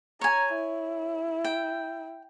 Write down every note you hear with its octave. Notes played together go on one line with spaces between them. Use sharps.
C#5 G#5 A#5
E4
G5